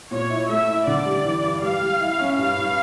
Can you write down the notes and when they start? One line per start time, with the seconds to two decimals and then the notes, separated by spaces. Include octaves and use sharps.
0.11 A#2 C#5
0.30 E4
0.49 A3 E5
0.68 E4
0.87 D3 D5
1.06 G3
1.25 E3
1.43 G2
1.62 G3 F5
1.80 G3
2.01 E4
2.19 C#4
2.38 G2 F5
2.57 G2